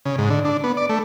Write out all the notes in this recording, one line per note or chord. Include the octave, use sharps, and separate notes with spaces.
C#3
G#2
D3
D4
B3
D5
A3